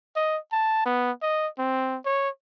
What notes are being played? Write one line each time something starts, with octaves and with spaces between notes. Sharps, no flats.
D#5
A5
B3
D#5
C4
C#5